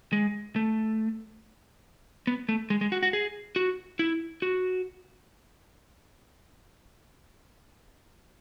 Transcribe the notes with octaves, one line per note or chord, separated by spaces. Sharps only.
G#3
A3
B3
A3
G#3
G#3
F#4
F#4
G#4
F#4
E4
F#4